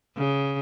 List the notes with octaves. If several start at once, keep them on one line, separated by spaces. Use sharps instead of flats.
C#3